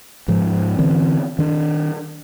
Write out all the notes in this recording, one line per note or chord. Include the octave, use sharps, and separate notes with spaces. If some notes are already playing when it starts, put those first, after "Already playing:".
G#2 F3
D3 E3 C4
D#3 D4